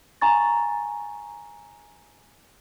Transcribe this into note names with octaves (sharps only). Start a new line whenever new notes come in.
G#5 A#5 C#6 A6